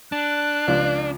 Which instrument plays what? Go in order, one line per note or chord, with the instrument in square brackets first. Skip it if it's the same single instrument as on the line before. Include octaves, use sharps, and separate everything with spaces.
[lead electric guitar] D4 [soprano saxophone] A5 [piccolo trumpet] F#6
[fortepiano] C#2 F3 F4 [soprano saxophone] D5